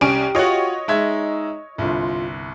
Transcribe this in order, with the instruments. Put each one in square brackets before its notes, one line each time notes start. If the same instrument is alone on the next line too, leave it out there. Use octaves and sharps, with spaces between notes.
[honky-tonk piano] C2 C#4 D7 [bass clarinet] G4
[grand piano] F4 F#4 [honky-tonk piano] C#5 D#5
[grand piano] G#3 E5 G#6 [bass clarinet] D#4
[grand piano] G1 C2 [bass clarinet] F4